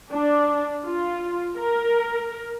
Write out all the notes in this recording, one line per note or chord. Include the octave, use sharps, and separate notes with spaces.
D4
F4
A#4